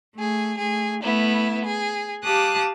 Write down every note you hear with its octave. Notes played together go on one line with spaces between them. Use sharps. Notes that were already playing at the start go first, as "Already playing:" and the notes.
A3 G#4
A3 G#4
A3 B3 E4
G#4
G4 F5 A5 D6 D#6 F#6